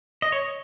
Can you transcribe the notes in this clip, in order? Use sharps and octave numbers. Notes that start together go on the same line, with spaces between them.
D#5
C#5